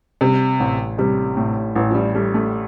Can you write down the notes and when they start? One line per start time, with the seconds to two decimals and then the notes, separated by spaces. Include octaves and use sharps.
0.21 C3 G3
0.60 A1
0.98 C3 G3
1.37 A2
1.75 A1 E3
1.91 F3
1.95 G3
2.15 G3 A3
2.34 A3